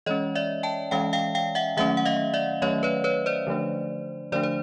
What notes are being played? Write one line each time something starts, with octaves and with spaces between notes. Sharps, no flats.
E3 G#3 C#4 C#5 D#5
D5 E5
G5 A5
E3 G#3 C#4 F5 G5
F5 G5
F5 G5
E5 F#5
D#3 F#3 A3 C#4 E5 F#5
F#5
D#5 F5
D5 E5
D#3 F#3 A3 C#4 C#5 D#5
B4 C#5
B4 C#5
C5 D5
D3 F3 A3 D4
D3 F3 A3 D4 C5 D5
C5